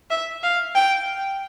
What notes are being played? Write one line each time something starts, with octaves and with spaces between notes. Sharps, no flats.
E5
F5
G5